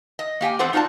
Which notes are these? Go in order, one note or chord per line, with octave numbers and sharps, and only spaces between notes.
D#5
A#3 G4 G5 G#5
E2 E3 C4 A4 C5 F#5
D#4 F4 F#4 D5 A5